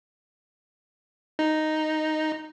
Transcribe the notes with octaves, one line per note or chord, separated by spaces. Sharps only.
D#4